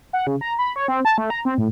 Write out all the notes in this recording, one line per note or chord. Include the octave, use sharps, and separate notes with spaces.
F#5
C#3
A#5
B5
C#5
C4
A5
A3
A#5
C4
A2